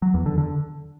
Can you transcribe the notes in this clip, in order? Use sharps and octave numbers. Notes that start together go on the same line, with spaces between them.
F#3
E2
D3
D3